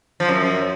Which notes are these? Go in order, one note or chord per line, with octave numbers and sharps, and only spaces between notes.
F3
F#2